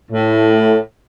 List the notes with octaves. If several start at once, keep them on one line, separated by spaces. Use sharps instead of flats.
A2